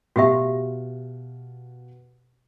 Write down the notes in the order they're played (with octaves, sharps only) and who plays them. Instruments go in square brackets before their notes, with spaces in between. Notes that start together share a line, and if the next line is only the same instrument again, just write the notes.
[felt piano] B2 F5 [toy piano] F#4 G4 E5